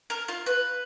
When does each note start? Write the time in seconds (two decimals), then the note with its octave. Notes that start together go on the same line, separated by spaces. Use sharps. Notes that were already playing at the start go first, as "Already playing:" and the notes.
0.10 A#4
0.28 F4
0.46 B4